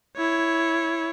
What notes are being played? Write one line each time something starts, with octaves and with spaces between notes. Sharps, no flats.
E4 C#5